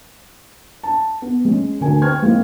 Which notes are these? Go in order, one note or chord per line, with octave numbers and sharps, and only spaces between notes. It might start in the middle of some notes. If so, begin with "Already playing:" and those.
A5
B3
G#3 C#4
D2 D3 A#4 G#5
B4 C5 G5 C#6 F6 G#6
G#3 A#3 C4 E4